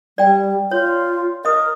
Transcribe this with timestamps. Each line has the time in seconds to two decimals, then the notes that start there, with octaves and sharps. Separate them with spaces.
0.18 G3 D5 G5
0.71 F4 C#5
1.45 A#4 D#5 D#6